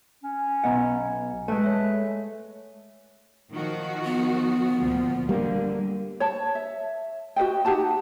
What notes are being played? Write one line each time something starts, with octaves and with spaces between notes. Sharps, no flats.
C#4
B1 B3 D#5 F#5 A#5
G#3 A3 B4 A5
C#5 E5
D#3 F3 F#4
B3
D2 A#2 F3
D3 G3 A#3
C#5 A5
E5
F#4 B4 D#5 G5
D#4 G4 F#5 A5